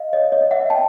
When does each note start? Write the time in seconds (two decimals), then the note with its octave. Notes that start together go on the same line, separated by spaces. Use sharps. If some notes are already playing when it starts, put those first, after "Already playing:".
Already playing: D#5 F5
0.13 C#5 D#5
0.32 C#5 D#5
0.51 E5 F#5
0.70 G5 A5